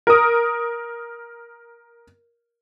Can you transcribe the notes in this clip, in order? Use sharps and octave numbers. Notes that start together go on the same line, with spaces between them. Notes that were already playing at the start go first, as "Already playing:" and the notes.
A#4 D#6